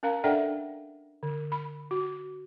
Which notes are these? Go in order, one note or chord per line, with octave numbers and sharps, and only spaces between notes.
C#4 A#4 F5 A#5
D4 A4 D5 E5 F#5 G5
D3
B5
F#4